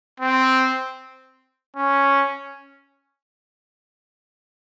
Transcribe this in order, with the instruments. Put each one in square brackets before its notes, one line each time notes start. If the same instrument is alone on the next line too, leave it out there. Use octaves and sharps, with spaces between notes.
[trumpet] C4
C#4